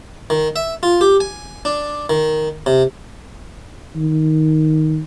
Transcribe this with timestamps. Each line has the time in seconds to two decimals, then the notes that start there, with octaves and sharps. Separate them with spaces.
0.30 D#3
0.56 E5
0.83 F4
1.01 G4
1.20 G#5
1.65 D4
2.10 D#3
2.66 C3
3.96 D#3